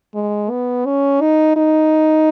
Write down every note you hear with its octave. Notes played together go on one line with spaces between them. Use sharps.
G#3
B3
C#4
D#4
D#4